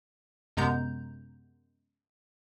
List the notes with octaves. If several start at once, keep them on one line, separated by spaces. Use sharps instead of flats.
F#2 C3 G#3 B3 A#5 G6